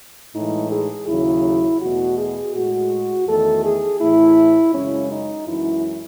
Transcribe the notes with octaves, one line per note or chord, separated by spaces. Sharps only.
A2 E3 G#3 D#4
G#4
D#2 C#3 F#3 E4
E2 B2 A3 F#4
G#4
A2 G#3 F#4
E2 D#3 A3 A4
G#4
A2 E3 A3 E4
F#2 C#3 G#3 C#4
D#4
F#2 E3 G#3 E4